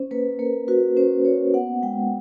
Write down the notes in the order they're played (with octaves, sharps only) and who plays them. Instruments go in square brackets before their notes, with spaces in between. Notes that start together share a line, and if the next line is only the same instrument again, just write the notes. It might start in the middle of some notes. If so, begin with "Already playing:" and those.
Already playing: [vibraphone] C#4 C5
A#3 B4
A#3 A#4
F#4 B4
C#4 C5
A#3 C#5
B3 F#5
G#3 G5